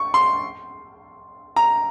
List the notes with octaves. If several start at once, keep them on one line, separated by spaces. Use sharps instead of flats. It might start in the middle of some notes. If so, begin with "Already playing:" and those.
Already playing: C#6
C6
A#5